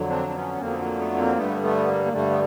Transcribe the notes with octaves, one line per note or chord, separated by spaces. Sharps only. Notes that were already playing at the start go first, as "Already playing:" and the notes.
Already playing: F2 D3 F#3
C4 D4
C4
B3 C#4
F2 D3 F#3 A#3 C4
B3
A#3
A3 B3
A#3 C4
G2 D3 G3 A3 B3
A3 B3
A#3
A#3
G2 D3 G3 A3
B3